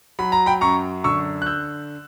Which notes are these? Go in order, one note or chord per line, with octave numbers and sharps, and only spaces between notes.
F#3 B5
A#5
G5 B5
F#2 A#5 C#6
D3 C#6 E6
F#6
E6 G6